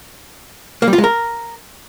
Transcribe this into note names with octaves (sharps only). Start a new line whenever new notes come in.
A#3
G3
F4
G#3
A#4